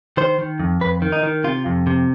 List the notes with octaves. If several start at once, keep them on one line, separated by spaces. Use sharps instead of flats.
D#3 C5
D#3
F2
F2 B4
D#3
D#4
D#3
C3 F4
F2
C3